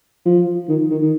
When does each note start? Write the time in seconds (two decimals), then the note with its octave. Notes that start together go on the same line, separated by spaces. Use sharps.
0.26 F3
0.69 D#3
0.91 D#3
1.02 D#3